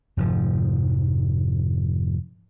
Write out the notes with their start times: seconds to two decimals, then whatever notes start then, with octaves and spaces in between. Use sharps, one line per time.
0.17 F1 G#2 F3